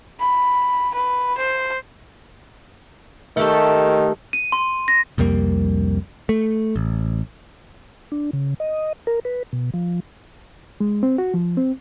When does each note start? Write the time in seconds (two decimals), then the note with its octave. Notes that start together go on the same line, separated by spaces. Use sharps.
0.20 B5
0.94 B4
1.37 C5
3.37 D#3 A3 G4 A4
4.33 D#7
4.52 C6
4.88 A#6
5.18 C2 F2 G3 A#3
6.29 A3
6.76 A1
8.12 D4
8.33 C#3
8.60 D#5
9.07 A#4
9.25 B4
9.53 B2
9.74 F3
10.80 G#3
11.03 C4
11.18 F#4
11.34 F3
11.57 C4